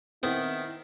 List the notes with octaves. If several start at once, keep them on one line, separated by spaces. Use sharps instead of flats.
D#3 B3 C4 E4